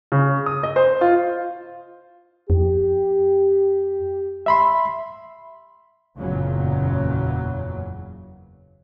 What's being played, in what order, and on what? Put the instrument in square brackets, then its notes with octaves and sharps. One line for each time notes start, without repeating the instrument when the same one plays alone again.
[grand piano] C#3
D#6
D#5
C5
F4
[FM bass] F2 [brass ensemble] G4
[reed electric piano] E5 B5 C6
[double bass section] F#1 E2 A#2 C#3 F#3